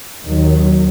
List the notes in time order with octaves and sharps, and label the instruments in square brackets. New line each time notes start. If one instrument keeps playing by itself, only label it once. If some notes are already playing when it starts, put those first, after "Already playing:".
[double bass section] D#2 D#3 F#3